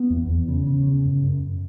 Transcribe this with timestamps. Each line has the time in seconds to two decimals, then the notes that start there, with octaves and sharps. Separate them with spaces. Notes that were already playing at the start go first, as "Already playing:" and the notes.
Already playing: B3
0.10 E2
0.29 E2
0.48 C#3
0.67 C#3
0.87 C#3
1.05 F#2
1.24 F#2